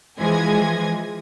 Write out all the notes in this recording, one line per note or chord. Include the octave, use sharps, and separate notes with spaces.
E3 F3 G#3 G#5 G#6 A#6